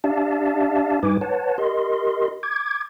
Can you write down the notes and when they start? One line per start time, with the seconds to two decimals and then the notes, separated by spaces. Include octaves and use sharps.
0.04 D4 G4 D5 E5 F5 A5
1.03 G2 G3 D#4 B4 G#5 D6
1.21 B4 C#5 F#5 A5
1.58 G4 A#4 D#5 C6
2.43 D6 G#6